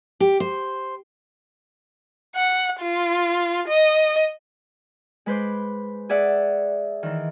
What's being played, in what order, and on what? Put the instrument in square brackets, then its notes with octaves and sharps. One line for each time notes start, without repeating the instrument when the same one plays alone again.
[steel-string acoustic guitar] G4
C5
[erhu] F#5
F4
D#5
[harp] G#3 B4 C5 D6
G#4 D5 E5 F#5
D#3 E3